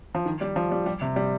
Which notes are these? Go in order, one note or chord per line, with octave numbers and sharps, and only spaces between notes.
F3
D#3
G3
F3
G3
G3
C3
G3